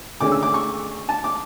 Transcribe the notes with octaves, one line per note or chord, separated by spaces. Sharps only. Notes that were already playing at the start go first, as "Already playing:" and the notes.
D2 D3 G#3 C#4 D6
E6
D6
C#6
A5
D6